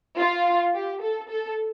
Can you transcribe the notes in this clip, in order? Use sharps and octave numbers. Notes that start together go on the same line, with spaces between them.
F4
G4
A4
A4